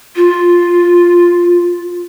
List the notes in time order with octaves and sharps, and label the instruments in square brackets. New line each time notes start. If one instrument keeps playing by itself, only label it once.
[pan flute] F4